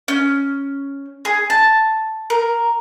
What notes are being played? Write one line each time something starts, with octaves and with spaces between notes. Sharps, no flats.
C#4
G#4
A5
A#4